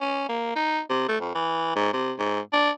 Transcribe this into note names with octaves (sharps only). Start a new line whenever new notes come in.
C#4
A#3
D#4
C3
A3
F2
E3
G#2
C3
G#2
D4